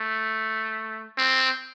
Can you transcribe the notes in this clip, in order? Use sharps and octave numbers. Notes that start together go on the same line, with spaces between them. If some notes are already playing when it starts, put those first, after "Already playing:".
Already playing: A3
C4